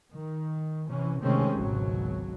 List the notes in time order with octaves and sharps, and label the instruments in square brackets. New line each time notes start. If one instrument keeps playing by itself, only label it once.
[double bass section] D#3
C3 E3 C#4
C3 D#3 G#3 A3 C4 C#4
G#1 C#2 B2 F#3